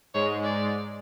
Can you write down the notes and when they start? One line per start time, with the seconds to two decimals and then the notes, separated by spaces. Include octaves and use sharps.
0.14 G#2 G#3 C#5
0.44 D5